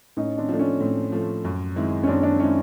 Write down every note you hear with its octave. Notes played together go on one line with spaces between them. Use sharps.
A2 C#4 D#4
C4 D4
F3 A3 D4
C#4
A2 C4
F3 A3
F#2
D#3 G#3 C4 E4
C#4
F#2 C4 D4
C4 D4
D#3 G#3 C4 C#4 E4